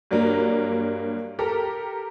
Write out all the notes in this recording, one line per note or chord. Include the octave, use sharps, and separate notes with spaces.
G2 F#3 G3 A#3
G4 A4 A#4